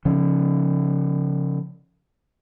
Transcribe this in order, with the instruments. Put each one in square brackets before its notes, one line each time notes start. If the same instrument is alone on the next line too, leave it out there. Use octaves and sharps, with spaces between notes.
[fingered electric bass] C#3 F3 C#4